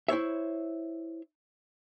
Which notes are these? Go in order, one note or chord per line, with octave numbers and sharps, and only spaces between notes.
E4 C5 C#5 E5